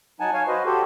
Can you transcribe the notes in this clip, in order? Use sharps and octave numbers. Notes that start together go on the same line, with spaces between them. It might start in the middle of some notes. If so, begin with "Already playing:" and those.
F#3 D#4 F#5 G#5 A5
C#5 F5 G#5
F#4 B4 C5 D#5
F#4 G4 A4 C5